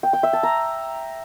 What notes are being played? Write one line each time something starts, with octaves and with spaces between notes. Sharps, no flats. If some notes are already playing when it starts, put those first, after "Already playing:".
G5
G5
E5
A5
A#5